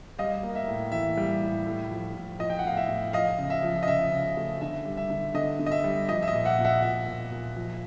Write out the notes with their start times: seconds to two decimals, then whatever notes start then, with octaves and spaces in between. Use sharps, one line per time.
0.19 G3 D#5 F5
0.43 A#3
0.55 E5
0.68 A2
0.92 E3 E5
1.17 G3
1.42 A2
1.66 A2
1.91 F3
2.15 A2
2.39 F3 D#5
2.50 G5
2.59 F#5
2.65 A2 F5
2.77 E5
2.88 A2
3.13 F3 D#5 F5
3.38 C#3
3.50 E5
3.63 F3
3.83 D#5
3.87 C#3 E5
4.12 C#3
4.37 A3
4.61 D3 E5
4.85 G3
4.97 E5
5.10 D3
5.34 D3 D#5
5.59 D3
5.66 D#5
5.72 E5
5.84 G3
6.08 F3 D#5
6.22 E5
6.28 D#5
6.33 A#2
6.45 E5 F#5
6.58 A#2
6.65 E5 F#5
6.82 A#2 E5
7.06 A#2
7.32 A#2
7.56 F3